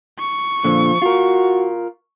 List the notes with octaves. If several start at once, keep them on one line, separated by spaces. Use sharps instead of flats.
C#6
A#2 D3 F3
F4 F#4 A#4